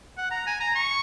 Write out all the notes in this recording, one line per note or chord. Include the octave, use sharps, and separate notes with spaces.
F#5
A#5
G#5
A#5
C#6